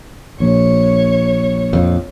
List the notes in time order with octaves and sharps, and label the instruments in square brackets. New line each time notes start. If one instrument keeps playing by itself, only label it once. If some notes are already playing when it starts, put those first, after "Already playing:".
[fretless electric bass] A#1 [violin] C#5
[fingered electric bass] F2